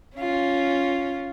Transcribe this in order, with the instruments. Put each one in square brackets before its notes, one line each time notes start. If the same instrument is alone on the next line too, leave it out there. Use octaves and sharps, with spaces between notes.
[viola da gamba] C#4 F4